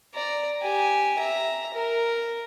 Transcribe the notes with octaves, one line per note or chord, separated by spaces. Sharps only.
D5 A#5
G4 G#5
E5 A#5
A#4